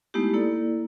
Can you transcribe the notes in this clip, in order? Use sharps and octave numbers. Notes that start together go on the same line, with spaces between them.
G#3 A3 B3 D#4 E4 G4
A#3 E4 A4 D5